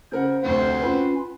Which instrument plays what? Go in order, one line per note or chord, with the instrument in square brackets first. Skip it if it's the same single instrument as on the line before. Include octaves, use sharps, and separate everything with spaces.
[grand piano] C#3 A#4 F#5 [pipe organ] C5
[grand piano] F1 D2 C3 [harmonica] C4 F#4 F#5
[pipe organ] C#4 F4 [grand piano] B4